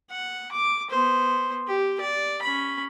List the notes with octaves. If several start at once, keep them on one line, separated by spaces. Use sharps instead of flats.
F#5
D6
B3 C5
G4
D5
C#4 B5